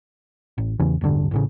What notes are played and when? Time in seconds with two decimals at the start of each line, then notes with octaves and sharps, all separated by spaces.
0.58 A1
0.80 E2 C#3 E3 C#4
1.01 E1 A1 G2 D3
1.31 A1 A2 C#3